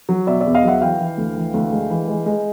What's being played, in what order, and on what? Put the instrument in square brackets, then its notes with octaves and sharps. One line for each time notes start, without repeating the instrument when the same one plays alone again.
[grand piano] F#3
B2 D5 E5
D5 E5
E2
D#5 F5
F#3 E5 F#5
E3 F5 G5
E3
D2
E3
D2
G#3
E3
G#3
G#3